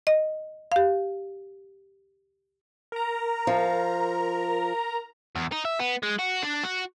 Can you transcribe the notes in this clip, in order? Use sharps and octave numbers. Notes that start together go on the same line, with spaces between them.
D#5
G4 F5
A#4 A#5
F3
E2
D#4
E5
B3
G#3
F#4
D4
F#4